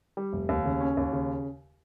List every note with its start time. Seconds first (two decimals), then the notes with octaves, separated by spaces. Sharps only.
0.17 G3
0.33 F1
0.49 D#2
0.65 C#3
0.81 C#4
0.97 D#2
1.13 C#3